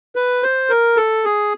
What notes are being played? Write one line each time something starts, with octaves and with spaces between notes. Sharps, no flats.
B4
C5
A#4
A4
G#4